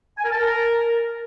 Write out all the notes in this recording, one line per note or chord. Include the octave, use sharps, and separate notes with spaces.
G#5
A#4
A5
A#4